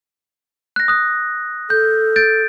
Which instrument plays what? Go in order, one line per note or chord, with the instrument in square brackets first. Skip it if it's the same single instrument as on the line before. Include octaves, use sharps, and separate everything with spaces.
[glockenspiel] F#6 A#6
D#6 F#6
[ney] A4 [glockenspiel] G6
[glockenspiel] G6 A6 D7